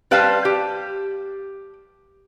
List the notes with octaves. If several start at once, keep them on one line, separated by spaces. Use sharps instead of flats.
G3 B4 C5 F5 A5
G4